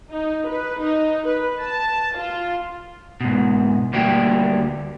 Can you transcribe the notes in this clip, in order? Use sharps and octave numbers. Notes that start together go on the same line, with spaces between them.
D#4
B4
D#4
B4
A5
F4
G#2 B2
D2 G3 A#3 F#4 G5